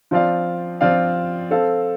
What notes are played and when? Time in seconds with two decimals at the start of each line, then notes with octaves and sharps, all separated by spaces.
0.11 F3 C4 F4 D5 F5
0.81 F3 C4 F4 D5 F5
1.51 C4 A4 F5